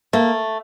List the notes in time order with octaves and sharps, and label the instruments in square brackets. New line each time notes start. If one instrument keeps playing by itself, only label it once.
[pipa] A3 [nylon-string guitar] A#3